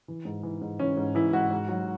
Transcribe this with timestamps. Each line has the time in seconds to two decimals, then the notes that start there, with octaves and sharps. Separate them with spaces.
0.08 E3
0.25 G#2
0.43 E3
0.62 G#2
0.80 E3 C#4
0.97 G#2
1.15 E3 E4
1.33 G#2 F#4
1.51 G#2
1.69 F#3